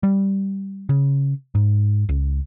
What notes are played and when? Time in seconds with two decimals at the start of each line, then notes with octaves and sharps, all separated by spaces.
0.03 G3
0.89 C#3
1.55 G#2
2.09 C#2